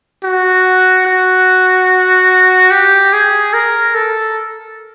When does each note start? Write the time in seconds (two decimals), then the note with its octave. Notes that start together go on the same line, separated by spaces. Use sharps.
0.23 F#4
1.06 F#4
2.71 G4
3.13 G#4
3.54 A#4
3.95 A4